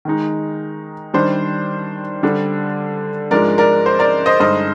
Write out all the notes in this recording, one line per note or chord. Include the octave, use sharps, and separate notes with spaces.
D#3 G#3 D#4
D#3 G3 D4 C5
D3 G3 D4
G#2 F3 G#3 D4 A#4 D5
A#4 D5
C5
A#4 D5
C5 D#5
G2 D3 G#3 D#4 C5 D#5